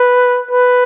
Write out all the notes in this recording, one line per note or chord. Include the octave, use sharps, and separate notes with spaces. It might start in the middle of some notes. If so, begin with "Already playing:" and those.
Already playing: B4
B4